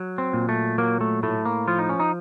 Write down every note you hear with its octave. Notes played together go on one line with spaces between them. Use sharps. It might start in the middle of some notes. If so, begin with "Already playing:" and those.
Already playing: F#3
C4
A#2
A3
F#3 A#3
A3
A2 A3
A#3
F3 F4
D#4
C#4
D#4